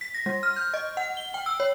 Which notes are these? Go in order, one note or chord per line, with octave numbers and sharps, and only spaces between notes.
B6
A#6
G3
F6
G6
D#5
F#5
G7
G5
E6
C#5